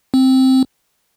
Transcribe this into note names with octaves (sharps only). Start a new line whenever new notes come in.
C4